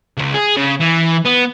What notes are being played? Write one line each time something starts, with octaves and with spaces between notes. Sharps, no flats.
C#2 C#3
G#4
C#3
E3
B3